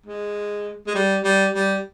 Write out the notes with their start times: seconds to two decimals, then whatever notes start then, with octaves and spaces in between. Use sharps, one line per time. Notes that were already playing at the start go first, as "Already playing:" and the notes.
0.06 G#3
0.87 G#3
0.95 G3
1.24 G3
1.54 G3